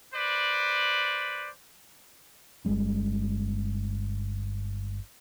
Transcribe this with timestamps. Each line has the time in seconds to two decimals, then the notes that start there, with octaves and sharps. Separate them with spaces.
0.14 B4 C5 D5
2.65 G1 G3 G#3 C#4